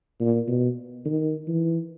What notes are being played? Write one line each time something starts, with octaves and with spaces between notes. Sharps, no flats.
A#2
B2
D#3
E3